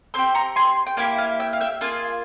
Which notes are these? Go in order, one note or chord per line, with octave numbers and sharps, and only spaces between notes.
C4 G4 C6 E6
A#5 C#6
G#5 C6
G5
A#3 E4 G4 F5 G#5
F5 G#5
E5 G5
F5
E5 G5
A#3 F4 G#4 F5 G#5